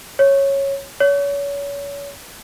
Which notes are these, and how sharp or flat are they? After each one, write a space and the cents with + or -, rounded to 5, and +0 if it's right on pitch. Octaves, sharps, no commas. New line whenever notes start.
C#5 -10
C#5 +35